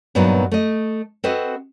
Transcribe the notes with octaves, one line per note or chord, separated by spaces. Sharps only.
G2 A#2 F#3 B3 D#4
A3 D#5
C4 F#4 A4 B4 D#5